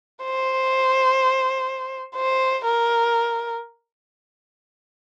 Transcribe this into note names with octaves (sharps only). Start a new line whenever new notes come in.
C5
C5
A#4